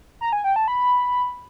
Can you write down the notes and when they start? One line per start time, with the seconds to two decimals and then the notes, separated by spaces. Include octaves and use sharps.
0.21 A#5
0.33 G#5
0.44 G5
0.56 A5
0.68 B5